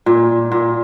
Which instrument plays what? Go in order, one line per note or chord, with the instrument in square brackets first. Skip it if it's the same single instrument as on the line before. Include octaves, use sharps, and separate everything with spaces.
[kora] A#2
A#2